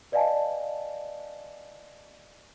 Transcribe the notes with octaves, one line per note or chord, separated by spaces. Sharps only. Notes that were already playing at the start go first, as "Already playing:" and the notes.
B4 D5 D#5 F5 G#5 A5